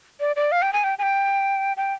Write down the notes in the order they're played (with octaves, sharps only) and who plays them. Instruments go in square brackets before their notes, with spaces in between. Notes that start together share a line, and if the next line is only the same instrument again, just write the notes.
[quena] D5
D5
F5
G5
G#5
G5
G#5
G5
G5